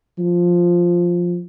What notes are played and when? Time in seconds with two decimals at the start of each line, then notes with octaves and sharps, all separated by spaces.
0.19 F3